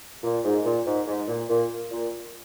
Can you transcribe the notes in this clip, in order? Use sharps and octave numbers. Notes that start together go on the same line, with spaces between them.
A#2
G#2
A#2
G#2
G#2
A#2
A#2
A#2